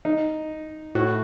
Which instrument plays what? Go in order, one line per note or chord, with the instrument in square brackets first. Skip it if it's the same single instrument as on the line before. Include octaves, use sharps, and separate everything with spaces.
[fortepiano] D#4
[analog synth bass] A2 [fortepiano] F#4